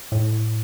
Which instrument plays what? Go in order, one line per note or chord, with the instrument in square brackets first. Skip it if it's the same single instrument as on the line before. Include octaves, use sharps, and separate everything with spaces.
[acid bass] A2